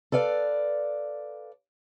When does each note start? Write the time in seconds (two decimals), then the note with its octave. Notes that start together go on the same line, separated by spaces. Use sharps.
0.12 A4 B4 D5 F5